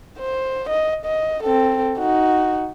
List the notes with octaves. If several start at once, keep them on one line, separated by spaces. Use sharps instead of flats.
C5
D#5
D#5
C4 A4
D#4 F#4